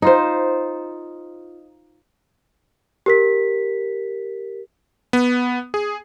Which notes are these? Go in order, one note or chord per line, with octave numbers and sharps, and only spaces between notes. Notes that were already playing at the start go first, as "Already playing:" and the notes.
D#4 F4 C5
G4 A#4 B6
B3
G#4